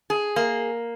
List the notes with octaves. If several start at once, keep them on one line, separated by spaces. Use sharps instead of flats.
G#4
A#3